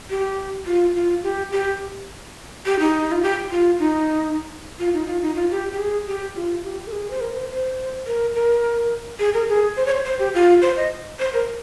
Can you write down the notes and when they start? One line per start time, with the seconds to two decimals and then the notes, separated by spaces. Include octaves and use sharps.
0.10 G4
0.66 F4
0.95 F4
1.23 G4
1.52 G4
2.66 G4
2.80 D#4
3.12 F4
3.23 G4
3.51 F4
3.79 D#4
4.79 F4
4.94 D#4
5.07 F4
5.22 D#4
5.35 F4
5.51 G4
5.73 G4
5.79 G#4
6.07 G4
6.35 F4
6.64 G4
6.87 A#4
6.92 G#4
7.11 C5
7.21 A#4
7.35 C5
7.50 C5
8.06 A#4
8.35 A#4
9.20 G#4
9.34 A#4
9.49 G#4
9.77 C5
9.86 C#5
9.92 C5
10.05 C5
10.19 G4
10.34 F4
10.62 C5
10.77 D#5
11.19 C5
11.33 A#4